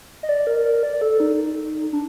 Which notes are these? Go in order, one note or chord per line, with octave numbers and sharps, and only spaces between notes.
D#5
D5
A#4
A#4
D5
A4
D#4
D4